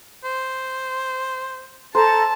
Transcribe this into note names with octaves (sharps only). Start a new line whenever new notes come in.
C5
A4 C5 A5 A#5